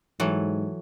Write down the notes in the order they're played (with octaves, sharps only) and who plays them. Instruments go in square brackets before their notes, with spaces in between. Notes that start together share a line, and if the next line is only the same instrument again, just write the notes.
[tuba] G#2 [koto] E3 F#3 A4